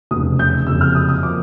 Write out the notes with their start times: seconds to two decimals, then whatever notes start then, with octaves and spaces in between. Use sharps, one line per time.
0.11 F1 E2 C#3 D#6
0.39 G6
0.67 F#1 F2 C3 E6
0.81 F6
0.95 D#6
1.09 D#6
1.23 F3 A#3 D6